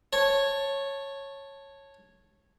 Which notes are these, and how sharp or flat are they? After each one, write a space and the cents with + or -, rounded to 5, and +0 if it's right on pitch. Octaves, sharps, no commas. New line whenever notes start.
C#5 -10 A5 +0